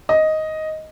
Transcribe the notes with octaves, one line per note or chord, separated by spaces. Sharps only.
D#5